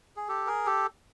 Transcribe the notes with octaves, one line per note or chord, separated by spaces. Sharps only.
G#4
G4 A4
G#4 A#4
G4 A4